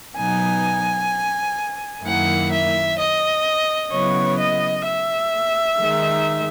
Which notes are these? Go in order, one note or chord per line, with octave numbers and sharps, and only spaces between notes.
B2 F#3 B3 D#4 G#5
F#2 D#3 A#3 E4 F#5
E5
D#5
C#3 F#3 B3 E4 C#5
D#5
E5
D#3 G#3 D#4